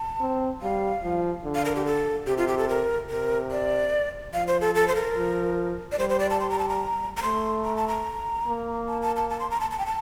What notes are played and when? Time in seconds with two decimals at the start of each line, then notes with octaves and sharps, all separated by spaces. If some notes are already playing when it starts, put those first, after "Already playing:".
Already playing: A5
0.20 C4
0.62 G3 F5
1.03 F3
1.44 D3
1.55 F5
1.65 A#4
1.75 G4
1.86 A4
2.27 C3 G4
2.37 F4
2.48 G4
2.58 A4
2.69 A#4
3.10 C3 A#4
3.51 D5
4.34 F3 F5
4.47 C5
4.61 A4
4.75 A4
4.88 C5
4.95 A#4
5.16 F3
5.92 D5
5.99 G3 C5
6.09 C5
6.20 D5
6.30 A5
6.40 C6
6.50 A#5
6.59 A5
6.69 A#5
7.17 A#5
7.23 A3 C6
7.65 A#5
7.76 A5
7.88 A#5
8.47 A#3
8.88 A5
9.02 A5
9.16 A5
9.30 A5
9.40 C6
9.51 A#5
9.61 A5
9.71 A5
9.79 G5
9.86 A5